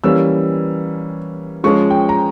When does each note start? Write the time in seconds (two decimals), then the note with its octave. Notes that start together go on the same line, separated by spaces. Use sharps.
0.04 E3 G3 A#3 C#4 E6
1.64 F3 G#3 C#4 C#6
1.91 G5
2.09 A#5